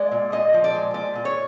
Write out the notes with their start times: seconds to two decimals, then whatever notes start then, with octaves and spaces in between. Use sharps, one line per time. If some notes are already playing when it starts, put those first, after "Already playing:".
Already playing: G#3 D5
0.11 A#2
0.32 A#2 D#5
0.54 F3
0.64 D5
0.75 G#3
0.94 A#2 D5
1.16 A#2
1.25 C#5